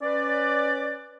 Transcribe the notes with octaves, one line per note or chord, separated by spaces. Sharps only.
C#4 B4 D5